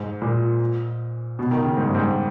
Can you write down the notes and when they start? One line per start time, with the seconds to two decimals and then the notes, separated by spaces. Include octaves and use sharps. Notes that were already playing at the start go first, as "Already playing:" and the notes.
Already playing: G#2
0.22 A#2
1.39 B2
1.51 D#3
1.65 C#3
1.77 G#2
1.86 G2
1.95 G#2